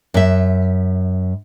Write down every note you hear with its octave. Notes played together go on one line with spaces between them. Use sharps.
F#2 E5